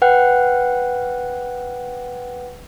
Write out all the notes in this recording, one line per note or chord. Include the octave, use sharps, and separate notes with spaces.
B4 F#5 G5 F#6